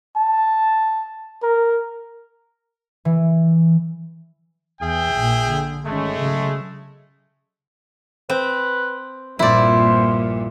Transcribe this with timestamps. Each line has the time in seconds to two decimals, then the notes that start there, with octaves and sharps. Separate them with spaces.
0.17 A5
1.43 A#4
3.05 E3
4.81 E2 G#4 E5 G5
5.16 A#1 A#2
5.49 D3
5.85 G#1 G#3 A3 C#4
6.19 C#3 F#3
8.30 C4 B4
9.39 A#1 G2 A#2 C4 E4 C5 D5